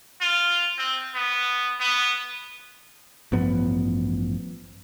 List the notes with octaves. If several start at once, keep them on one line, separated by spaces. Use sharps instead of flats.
F4
C4
B3
B3
A1 G2 F3 B3